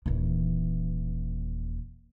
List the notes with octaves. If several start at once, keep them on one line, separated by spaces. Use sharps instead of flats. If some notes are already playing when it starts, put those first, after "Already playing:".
D#1 E3